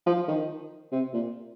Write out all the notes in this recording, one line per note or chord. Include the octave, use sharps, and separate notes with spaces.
F3
D#3
C3
A#2